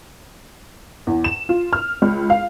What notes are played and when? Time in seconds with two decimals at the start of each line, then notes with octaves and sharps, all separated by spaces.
1.07 E2
1.24 E7
1.49 F4
1.73 F6
2.02 C#2
2.30 F5